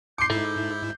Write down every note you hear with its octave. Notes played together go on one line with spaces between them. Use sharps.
C6 D6 G6 C7 C#7
G#2 D#4 E4 A4 E5